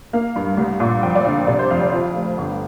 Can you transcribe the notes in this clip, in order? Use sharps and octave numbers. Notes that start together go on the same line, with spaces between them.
A#3 F5
G2
C2
A#2
F2 G5
D5
D3 F5
C3 D5
C5
F2 F5
D5
F3 F5
F1
G1